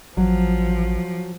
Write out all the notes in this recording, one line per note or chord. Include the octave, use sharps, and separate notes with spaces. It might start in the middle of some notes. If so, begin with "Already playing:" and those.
A1 F3 F#3